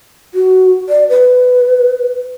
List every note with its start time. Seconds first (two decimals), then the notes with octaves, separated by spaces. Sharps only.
0.34 F#4
0.89 D5
1.10 B4